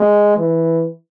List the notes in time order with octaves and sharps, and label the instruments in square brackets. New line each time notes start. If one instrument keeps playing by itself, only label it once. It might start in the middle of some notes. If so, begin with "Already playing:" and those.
Already playing: [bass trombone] G#3
E3